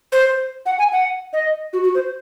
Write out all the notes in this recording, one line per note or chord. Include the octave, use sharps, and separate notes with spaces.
C5
F#5
G#5
F#5
D#5
F#4
F#4
C5